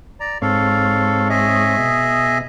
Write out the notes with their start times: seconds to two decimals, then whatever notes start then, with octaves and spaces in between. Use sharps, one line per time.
0.20 D5 A#5
0.42 G#2 C4 A4 C#5 F5
1.29 G#4 D#5 E5
1.78 B2